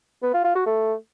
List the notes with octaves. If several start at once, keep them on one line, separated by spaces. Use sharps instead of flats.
B3
F4
F4
F#4
A3